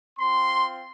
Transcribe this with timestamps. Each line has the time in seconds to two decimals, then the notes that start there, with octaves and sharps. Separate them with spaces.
0.19 C4 F4 C6